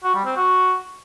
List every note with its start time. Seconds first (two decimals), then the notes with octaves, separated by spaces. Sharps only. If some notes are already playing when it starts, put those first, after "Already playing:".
0.04 F#4
0.14 G3
0.25 C4
0.36 F#4